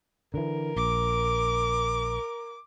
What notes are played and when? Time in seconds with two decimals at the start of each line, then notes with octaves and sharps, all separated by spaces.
0.34 D3 E3 A#4
0.76 A#1 D6